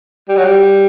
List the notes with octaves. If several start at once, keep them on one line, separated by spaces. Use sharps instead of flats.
G3
F#3
G3